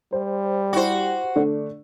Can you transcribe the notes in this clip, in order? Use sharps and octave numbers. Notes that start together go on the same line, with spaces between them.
G3 C5
E4 F#4 G4 C5
D3 A3 D4